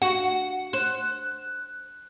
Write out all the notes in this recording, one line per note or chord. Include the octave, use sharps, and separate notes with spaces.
F#4 F#5
C5 F#6